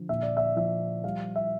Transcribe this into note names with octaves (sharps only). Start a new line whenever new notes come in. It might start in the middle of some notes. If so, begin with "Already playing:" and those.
Already playing: D3 F3
A#2 E5
D5
E5
F3 E5
G3 F5
E5